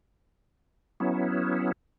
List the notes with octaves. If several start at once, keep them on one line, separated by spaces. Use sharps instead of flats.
F#3 B3 C#4 E4